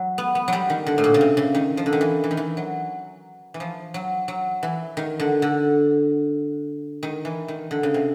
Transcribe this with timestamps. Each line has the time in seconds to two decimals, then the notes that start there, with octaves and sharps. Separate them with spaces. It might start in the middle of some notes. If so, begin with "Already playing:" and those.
Already playing: F#3
0.18 B3
0.35 B3
0.48 F#3 G3
0.70 D#3
0.86 D3
0.98 A2
1.04 A#2
1.14 C#3
1.21 C3
1.37 C#3
1.55 D#3
1.77 F3
1.86 D3
1.93 D#3
2.01 E3
2.24 E3
2.31 D#3
2.37 E3
2.57 F#3
3.54 E3
3.60 F3
3.94 F#3
4.28 F#3
4.63 E3
4.97 D#3
5.20 D3
5.42 D3
7.03 D#3
7.25 E3
7.48 D#3
7.71 D3
7.83 C#3
7.94 C3